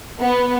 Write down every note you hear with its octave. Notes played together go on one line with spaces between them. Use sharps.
B3